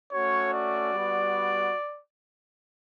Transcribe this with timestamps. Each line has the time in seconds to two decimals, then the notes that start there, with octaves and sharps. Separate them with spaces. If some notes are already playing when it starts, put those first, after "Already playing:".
0.11 A3 C#4 F#4 C#5
0.52 D5
0.93 G3 B3 F#4